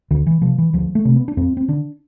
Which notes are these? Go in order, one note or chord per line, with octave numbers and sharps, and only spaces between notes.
D2 D3
E3
C3 F3
E3
D2 F3
A3
C3
B3
D4
F2 C4
C4
D3 D4